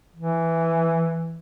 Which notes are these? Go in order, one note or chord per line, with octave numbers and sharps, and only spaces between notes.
E3